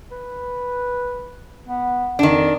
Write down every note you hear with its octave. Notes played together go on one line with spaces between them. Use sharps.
B4
B3
F2 D#3 D4